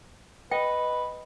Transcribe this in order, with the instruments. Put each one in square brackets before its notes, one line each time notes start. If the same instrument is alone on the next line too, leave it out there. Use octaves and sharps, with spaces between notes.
[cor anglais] B4 [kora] D#5 [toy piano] G5